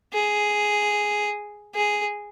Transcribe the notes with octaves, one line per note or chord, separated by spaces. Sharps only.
G#4
G#4